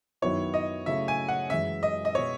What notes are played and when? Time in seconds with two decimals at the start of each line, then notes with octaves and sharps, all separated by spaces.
0.22 F#2 D#3 F#3 B3 E4 C#5
0.54 D#5
0.86 C#3 F#3 A3 C#4 E4 E5
1.08 G#5
1.28 F#5
1.50 F#2 E3 G#3 C#4 E5
1.83 D#5
2.05 D#5
2.15 B2 G#3 B3 E4 C#5